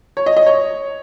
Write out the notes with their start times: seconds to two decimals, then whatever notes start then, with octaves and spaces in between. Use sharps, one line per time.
0.17 C#5
0.26 D#5
0.37 D#5
0.46 C#5